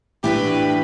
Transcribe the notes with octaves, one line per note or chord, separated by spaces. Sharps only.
A2 E3 D4 F#4 G4 B4